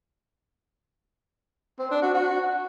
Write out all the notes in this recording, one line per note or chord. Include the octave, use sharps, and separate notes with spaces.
C4
D4
F#4
F#4